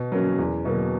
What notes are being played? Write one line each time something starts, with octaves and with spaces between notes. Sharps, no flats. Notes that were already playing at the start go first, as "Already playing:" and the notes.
Already playing: B2
F#3 A#3 C#4
E2
B2 F#3 A#3